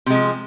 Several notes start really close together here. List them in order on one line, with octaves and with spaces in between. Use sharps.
C3 G#3 F3